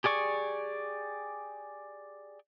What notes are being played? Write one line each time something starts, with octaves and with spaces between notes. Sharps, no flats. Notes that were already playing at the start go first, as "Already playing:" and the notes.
G4 G#4 D5 C#6